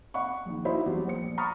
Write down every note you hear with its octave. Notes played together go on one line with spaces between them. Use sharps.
D#5 F#5 B5 C#6
A#1 D#3
D#4 E4 F#4 C5 D#5 B5
E2 F#3 G3
A#1 C5 C#7
A#5 B5 C#6 D#6 F6 A6